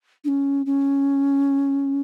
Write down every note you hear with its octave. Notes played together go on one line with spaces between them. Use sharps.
D4
C#4
C#4